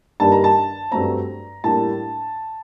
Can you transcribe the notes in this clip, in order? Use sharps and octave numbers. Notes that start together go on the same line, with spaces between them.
G2 D#3 G3 A#3 D4 A5
A#5
A5
G2 F#3 A3 C4 A#5
A2 G3 A#3 D4 A5